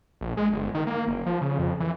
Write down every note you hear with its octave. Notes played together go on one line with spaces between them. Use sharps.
A#1
G#3
G1
D#3
A#3
F#1
F3
C#3
F2
E3